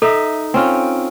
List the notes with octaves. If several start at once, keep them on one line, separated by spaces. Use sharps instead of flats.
D#4 A4 E5
C4 C#4 F4